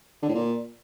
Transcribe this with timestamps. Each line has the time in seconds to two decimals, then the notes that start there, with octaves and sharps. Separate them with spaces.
0.23 D3
0.29 A2
0.35 A#2